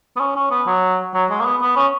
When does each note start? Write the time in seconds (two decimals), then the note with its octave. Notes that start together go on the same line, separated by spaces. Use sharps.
0.16 B3
0.20 C#4
0.35 C#4
0.51 B3
0.67 F#3
1.14 F#3
1.30 G#3
1.40 A#3
1.46 B3
1.62 B3
1.76 C#4